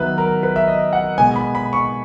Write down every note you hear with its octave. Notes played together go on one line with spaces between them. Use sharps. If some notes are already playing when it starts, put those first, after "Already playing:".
Already playing: D#3 F#3 B3 B4 E5
A#4
B4
E5
D#5
F#5
B2 G#3 B3 G#5
B5
B5
C#6